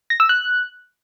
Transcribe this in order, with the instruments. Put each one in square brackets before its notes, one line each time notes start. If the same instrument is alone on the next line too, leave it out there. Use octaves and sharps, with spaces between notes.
[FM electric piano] A#6
E6
F#6